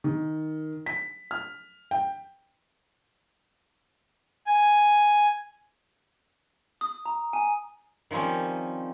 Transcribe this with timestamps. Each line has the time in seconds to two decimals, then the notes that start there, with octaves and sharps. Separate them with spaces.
0.04 D#3
0.86 B6
1.31 F6
1.91 G5
4.46 G#5
6.81 D#6
7.06 A#5
7.33 G#5
8.11 D#3 F3 G3 C4 C#4